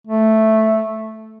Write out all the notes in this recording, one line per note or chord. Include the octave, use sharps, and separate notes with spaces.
A3